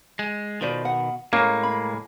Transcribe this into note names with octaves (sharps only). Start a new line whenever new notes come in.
G#3
B2 D#3 F4 C5 D5
F#5
A2 G#3 A#3 C#4 C#5
B5